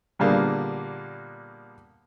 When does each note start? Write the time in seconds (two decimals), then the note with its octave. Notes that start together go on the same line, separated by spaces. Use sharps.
0.19 A#2 D3 G3 A#3 B3 G#4